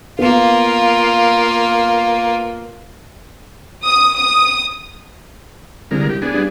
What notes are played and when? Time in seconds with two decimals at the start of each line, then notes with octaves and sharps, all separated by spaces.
0.19 A#3 B3 F4
3.84 D#6
4.14 D#6
5.91 C2 D3 G#3 A#4
6.09 G4
6.22 B3 D4 G#4
6.34 G2